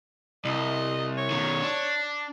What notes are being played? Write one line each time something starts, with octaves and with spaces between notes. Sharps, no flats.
C2 D#5
C#5
B2 D#3
D4